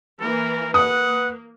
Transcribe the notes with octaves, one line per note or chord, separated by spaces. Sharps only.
E3 A#3 A#4
A#3 B4 F#5 D#6